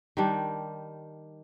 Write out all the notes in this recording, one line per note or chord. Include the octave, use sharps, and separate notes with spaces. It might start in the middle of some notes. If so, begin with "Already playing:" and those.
D#3 G3 D4